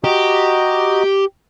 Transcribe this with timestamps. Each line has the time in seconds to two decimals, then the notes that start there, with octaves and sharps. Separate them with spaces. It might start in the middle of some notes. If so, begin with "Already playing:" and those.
0.04 F#4 G4 D#5 A#5